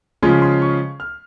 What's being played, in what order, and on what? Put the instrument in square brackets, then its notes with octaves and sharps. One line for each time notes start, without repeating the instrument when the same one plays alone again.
[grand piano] C#3 F3 G#3 C#4 F4 C6
C6
C#6
F6